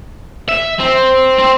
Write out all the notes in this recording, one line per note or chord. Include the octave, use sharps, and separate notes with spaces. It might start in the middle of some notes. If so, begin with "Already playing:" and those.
E5
C4
C4